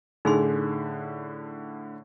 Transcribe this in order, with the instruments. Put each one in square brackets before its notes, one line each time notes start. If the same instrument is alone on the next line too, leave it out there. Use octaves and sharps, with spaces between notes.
[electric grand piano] A2 D3 [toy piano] D#4 G#4 C6